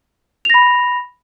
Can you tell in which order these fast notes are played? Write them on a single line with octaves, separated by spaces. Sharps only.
F7 A#6 B5